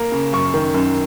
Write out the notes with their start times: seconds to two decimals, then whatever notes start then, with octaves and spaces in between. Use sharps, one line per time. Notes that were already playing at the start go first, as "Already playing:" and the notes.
Already playing: A#3 A#5
0.12 C#3
0.33 F#2 C#6
0.54 D#3
0.74 F#2